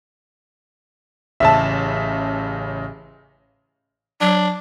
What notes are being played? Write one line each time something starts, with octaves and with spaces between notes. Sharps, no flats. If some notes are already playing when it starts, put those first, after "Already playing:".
A1 C#3 E5 A5 E7
F#3 D4